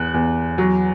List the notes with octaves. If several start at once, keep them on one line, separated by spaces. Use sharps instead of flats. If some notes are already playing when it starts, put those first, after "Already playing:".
Already playing: E2 F#6
E2
F#3